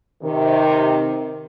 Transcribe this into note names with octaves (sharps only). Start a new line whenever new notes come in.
C3 D#3